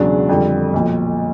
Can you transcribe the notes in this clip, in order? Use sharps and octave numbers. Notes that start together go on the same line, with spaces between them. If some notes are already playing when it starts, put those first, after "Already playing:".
Already playing: E1 E2 C#3 F#3 D4
F2 D3 G3
B1 A#2 F3